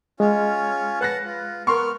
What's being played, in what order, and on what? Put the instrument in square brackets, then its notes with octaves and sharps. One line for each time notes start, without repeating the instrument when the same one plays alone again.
[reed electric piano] G#3 [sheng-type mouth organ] C#4 F4 C#5
[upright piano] B4 F#6 A#6 [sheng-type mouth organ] F#5 A5
[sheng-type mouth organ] F4
[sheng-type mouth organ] B3 F6 [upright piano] A#4 C6 C#6